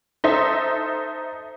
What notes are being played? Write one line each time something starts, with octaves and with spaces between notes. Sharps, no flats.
D#4 A4 C5 E5